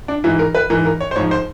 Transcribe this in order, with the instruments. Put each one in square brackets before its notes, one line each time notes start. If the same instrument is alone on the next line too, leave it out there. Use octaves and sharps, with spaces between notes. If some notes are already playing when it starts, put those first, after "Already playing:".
[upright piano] D4
G#2 E3 E4
A#4
B4
G#2 E3 A#4
A#4
C#5
C5
G#2 F3 C#5
C5